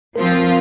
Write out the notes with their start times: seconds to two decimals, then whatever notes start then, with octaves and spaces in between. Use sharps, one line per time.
0.16 F3 C4 F4 A#4